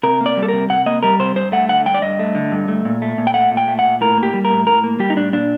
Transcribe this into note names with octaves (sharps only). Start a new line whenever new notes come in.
C3 A#4
A#3
D5
G3
A4
C3 A#4
C3 F#5
A#3 D#5
G3 A#4
C3 C5
G2 C5
A3 F#5
D3 F#5
G2 G5
D5
G2 D#5
A3
D3
G2
A3
A#2
A3
A#2
G5
A3 F#5
A#2
G5
A3
A#2 F#5
A2 A#4
A#3
G4
G3
A#4
A2
A2 A#4
A#3
G3 G4
D#4
A2 D4
A#2 D4